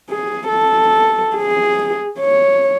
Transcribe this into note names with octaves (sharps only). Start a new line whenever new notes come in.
G#4
A4
G#4
C#5